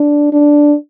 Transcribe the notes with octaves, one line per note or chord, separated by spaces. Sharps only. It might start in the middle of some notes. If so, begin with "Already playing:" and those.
Already playing: D4
D4